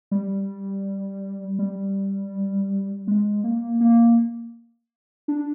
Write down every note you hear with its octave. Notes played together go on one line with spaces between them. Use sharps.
G3
G3
G#3
A#3
A#3
D4